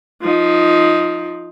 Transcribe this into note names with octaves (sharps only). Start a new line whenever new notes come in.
F3 D#4